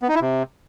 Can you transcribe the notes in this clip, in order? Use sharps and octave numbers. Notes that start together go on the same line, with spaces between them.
B3
D#4
E4
C3